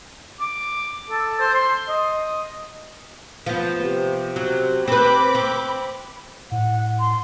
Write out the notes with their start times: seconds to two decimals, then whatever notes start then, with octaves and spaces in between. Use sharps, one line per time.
0.40 D6
1.10 A4
1.40 C5
1.54 C6
1.89 D#5
3.46 F3 B3
3.82 C3
4.36 F#3
4.88 C4 B4 B5 D6
5.35 C4
6.52 A2 F#5
7.00 C6